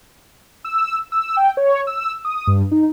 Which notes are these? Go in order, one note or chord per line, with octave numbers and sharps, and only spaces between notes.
E6
E6
G5
C#5
E6
D#6
G2
D#4